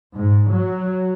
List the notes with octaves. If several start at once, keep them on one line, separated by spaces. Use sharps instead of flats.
G#2
F#3